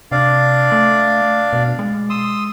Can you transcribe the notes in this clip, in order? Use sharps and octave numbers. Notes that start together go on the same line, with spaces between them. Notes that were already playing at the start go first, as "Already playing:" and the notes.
C3 D4 D5 F5
A3
B2
G#3
C6 D#6 E6